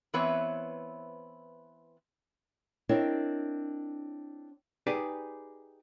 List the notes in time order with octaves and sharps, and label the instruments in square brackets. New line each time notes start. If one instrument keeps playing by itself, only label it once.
[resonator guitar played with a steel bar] E3 B3 C4 B4 C#5 E5
[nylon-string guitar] C4 D4 E4 A#4 C#5 D#5
[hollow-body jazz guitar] D#4 G4 G#4 B4 D5